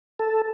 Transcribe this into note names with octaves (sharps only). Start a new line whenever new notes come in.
A4